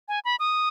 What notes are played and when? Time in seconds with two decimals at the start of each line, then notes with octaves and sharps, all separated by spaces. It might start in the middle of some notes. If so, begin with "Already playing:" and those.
0.08 G#5
0.25 B5
0.40 D#6